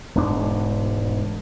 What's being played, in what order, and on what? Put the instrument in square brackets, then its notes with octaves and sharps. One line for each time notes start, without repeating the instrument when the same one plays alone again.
[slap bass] E1 D2 G#2 D4